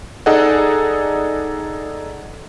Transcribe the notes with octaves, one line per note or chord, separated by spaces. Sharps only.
D#4 G#4 A4 D5 D#5 F#5